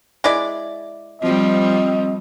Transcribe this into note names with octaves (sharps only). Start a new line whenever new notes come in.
G#3 E4 D5
F3 G3 C4 D#5